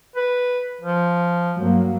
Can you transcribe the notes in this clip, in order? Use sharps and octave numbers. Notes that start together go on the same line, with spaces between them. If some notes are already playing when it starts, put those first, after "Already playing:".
B4
F3
G2 F#3 A#3